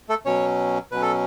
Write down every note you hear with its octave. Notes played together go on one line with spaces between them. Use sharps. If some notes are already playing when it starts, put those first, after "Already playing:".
A3 A4
B2 F#3 C#4 C#5
B2 F#3 C#4 B4
A4